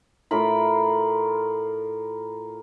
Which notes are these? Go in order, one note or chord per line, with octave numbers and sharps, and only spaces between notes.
A2 F4 A#4 B5